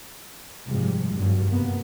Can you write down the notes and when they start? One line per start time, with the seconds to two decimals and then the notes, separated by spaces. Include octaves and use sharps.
0.67 F#1 G#2 C3 F3 G3 G#3
1.15 G2 B2 D#3 F#3
1.49 F#1 C3 A#3 B3